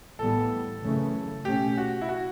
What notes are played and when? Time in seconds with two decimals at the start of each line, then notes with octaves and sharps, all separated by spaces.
0.19 A2 E3 G3 B3 A4
0.82 F#2 C#3 E3 A3 C#4
1.45 B2 A3 C#4 G4
1.78 F#4
2.01 E4
2.09 F#4